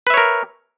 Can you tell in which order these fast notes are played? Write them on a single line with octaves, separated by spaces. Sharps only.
B4 E5 C#5 A#4